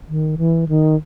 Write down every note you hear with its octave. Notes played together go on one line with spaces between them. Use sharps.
D#3
E3
D#3